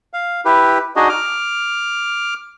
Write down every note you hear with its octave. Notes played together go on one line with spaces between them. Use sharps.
F5
E4 G4 B4
D4 D#4 F#4 G#4 D#5
D6 F6